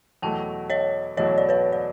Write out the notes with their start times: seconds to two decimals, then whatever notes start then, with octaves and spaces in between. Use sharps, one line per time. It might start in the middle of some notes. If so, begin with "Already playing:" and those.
0.22 E2 B2 F#3 A3 G5 A5
0.70 C#5 D#5
1.17 E2 B2 F#3 A3 C#5 D#5
1.38 D5
1.49 B4 C#5
1.72 D5